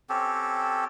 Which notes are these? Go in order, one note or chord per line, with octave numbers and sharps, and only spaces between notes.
C4 C#4 G4 A4